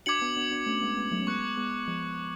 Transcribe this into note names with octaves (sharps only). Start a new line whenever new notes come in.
D4 F#4 D6 G#6 C#7 F#7
B3 D4
B3 D4
B3 D4
A3 C#4
G#3 B3
G#3 B3
F#3 A3
C#4
G#3 B3 C#6 F#6 C#7
G#3 B3
F3 G#3